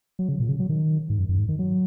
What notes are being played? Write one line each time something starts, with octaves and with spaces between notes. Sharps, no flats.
F#3
C#3
A#2
C#3
F#3
D#3
G#2
F#2
F#2
G#2
D#3
F#3